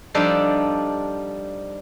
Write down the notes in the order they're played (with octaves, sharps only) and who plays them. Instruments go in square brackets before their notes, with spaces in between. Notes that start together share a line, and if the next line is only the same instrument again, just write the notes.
[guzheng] F3 G3 D4 D#4 A4 C5